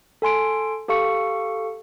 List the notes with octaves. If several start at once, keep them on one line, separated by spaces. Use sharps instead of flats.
A4 G#5 C6 D7
G4 A4 F5 C#6 C#7